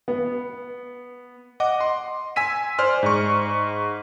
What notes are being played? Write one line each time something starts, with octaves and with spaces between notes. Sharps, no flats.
B3
D#5 F#5 D6
C6
G#5 E6 B6 D#7
C5 D5 C6 F6
G#2 C#6